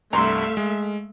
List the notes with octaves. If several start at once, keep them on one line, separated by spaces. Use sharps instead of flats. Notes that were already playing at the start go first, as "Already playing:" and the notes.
C2 G2 A3 E5 F5 A#5 C6
G#3